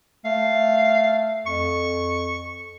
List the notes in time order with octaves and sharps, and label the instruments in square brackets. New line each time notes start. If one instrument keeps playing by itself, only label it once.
[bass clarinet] A3 [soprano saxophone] F5
[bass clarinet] F2 [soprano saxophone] C#6